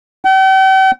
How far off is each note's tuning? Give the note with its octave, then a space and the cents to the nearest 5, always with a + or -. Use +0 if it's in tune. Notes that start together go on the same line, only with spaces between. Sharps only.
G5 -45